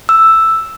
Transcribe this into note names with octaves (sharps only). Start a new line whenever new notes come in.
E6